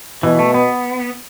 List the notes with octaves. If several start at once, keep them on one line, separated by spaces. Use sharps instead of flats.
B2 E3
A3
B3